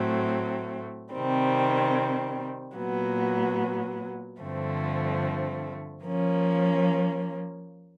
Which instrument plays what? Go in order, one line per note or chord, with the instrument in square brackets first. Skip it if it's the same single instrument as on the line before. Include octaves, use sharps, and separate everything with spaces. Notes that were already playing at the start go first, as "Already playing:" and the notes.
Already playing: [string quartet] A2 F#3 A3 C4
C3 D#3 G3 C4
A#2 F#3 B3
G2 D3 F3 A3 C4
F3 A#3 C#4